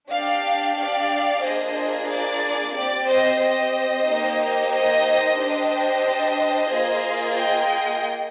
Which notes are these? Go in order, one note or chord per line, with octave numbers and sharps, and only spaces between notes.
D4 G4 D5 F5
D5 F5
A#3 D4 F4 G#4 C5 D#5
D5
C4 G4 D5
C5 D#5
C5 D#5
A#3 D#4 G4
C5 D#5
D4 G4 C5 D#5
A#3 F4 G#4
D#5 G5